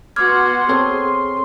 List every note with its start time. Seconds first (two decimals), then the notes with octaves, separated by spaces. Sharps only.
0.16 B3 F#4 F#5 C6 D6 F6 G#6
0.69 C4 G#4 A4 C#5 C6